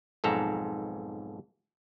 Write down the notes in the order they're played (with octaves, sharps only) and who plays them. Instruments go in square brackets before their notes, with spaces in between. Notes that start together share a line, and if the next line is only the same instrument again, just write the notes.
[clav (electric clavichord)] B1 F2 G#2 A4 A#5